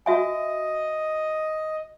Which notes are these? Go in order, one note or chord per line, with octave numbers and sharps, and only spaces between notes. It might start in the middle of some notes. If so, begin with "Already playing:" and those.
F#4 D#5 E5 G#5